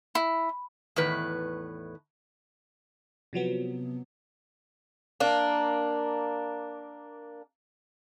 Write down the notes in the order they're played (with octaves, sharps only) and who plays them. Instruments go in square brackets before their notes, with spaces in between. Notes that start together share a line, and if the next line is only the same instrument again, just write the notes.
[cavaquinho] E4
[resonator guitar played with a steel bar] E2 A2 D#3 B4
[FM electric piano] C3 F3 F#3 B3
[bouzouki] A#3 D4